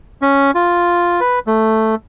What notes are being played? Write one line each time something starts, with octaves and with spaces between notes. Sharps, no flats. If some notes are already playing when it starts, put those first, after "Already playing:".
C#4
F4
B4
A3